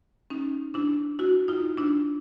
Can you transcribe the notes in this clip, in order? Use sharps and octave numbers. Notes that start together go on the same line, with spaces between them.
C#4 D#4
D4 E4
E4 F#4
D#4 F4
D4 E4